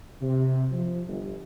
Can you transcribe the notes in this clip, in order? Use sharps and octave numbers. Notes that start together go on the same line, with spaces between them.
C3
F3
G1